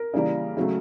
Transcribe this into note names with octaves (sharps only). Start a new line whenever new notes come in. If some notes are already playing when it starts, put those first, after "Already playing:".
Already playing: A#4
C#3 E3 G3 A#3
C#3 F#3 A3